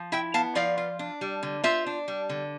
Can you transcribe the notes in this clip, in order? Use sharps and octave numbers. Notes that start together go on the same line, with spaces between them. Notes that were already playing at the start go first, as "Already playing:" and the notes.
Already playing: F3
E4 E5 G5
B3 F5 A5
F3 D5 F5
F4
D4
G3
D3
F4 C5 E5
D4
G3
D3